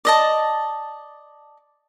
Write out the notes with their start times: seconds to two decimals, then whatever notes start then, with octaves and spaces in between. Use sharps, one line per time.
0.05 D5 D#5 A5